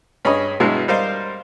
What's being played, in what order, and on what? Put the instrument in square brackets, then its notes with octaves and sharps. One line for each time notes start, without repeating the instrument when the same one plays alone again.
[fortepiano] G2 C#4 G#4 D#5 B5 D#6
G2 B2 F#3 G#3 E4
G3 A#4 C5 D#5 F5